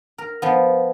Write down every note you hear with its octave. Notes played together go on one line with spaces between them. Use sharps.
A#4
F3 B3